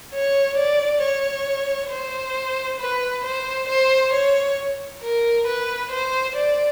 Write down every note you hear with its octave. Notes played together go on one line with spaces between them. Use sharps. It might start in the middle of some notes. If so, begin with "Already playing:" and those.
C#5
D5
C#5
C5
B4
C5
C5
C#5
A#4
B4
C5
D5